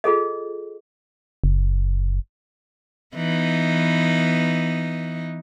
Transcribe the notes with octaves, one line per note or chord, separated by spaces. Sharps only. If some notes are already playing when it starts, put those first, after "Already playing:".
F4 G#4 A4 D#5
F#1
E3 B3 D#4